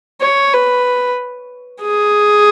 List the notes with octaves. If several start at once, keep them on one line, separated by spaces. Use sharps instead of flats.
C#5
B4
G#4